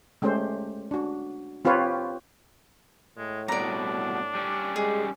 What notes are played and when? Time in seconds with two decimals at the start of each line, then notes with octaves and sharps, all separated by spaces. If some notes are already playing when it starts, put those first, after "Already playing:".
0.22 G#3 A3 C#4 G4 C5
0.91 D4 F#4
1.65 C4 F4 G4 B4 C#5
3.18 A2 G#3
3.48 C2 B2 D4 D5 A#5
4.35 G3 C#4
4.76 G#3 G#4